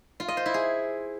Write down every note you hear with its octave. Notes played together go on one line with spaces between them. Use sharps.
F4
D#5
C5
E4
G#4